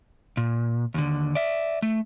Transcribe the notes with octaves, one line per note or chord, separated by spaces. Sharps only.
A#2
D#2 D3
D5 E5
A3